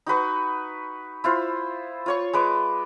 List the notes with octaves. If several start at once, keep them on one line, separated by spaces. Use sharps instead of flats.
D#4 F#4 B4 C#6
E4 F4 C5
F4 C#5 C#6
G#3 B4 D6